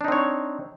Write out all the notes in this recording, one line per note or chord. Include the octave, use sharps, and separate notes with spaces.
C4 D4 D#4 C#5